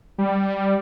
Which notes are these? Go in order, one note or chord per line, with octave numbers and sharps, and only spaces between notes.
G3